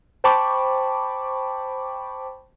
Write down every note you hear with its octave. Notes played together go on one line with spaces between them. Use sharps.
C5 G5 A5 B5 C#6 D6